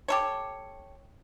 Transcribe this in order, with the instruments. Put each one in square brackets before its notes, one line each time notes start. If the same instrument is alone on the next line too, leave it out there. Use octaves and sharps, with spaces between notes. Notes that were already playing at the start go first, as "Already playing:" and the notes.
[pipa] G4 A4 C#5